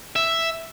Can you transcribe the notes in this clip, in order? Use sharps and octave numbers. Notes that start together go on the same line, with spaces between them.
E5